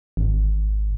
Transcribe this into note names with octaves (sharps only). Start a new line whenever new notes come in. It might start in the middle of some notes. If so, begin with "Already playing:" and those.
G#1